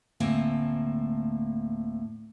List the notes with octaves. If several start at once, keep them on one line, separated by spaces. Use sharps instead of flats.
D2 A2 A#3 C4 G#5 A5